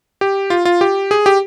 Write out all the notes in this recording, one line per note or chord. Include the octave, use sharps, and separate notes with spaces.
G4
F4
F4
G4
G#4
G4